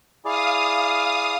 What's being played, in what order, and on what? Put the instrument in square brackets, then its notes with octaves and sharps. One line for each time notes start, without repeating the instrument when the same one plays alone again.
[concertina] E4 G#4 D5 [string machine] F5 D#6